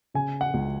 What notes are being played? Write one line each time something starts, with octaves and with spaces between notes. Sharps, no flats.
C#3 G#5
F#5
C#2